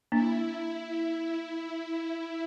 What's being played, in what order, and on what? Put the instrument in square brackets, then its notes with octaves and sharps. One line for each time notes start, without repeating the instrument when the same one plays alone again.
[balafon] A#3 D4 [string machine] E4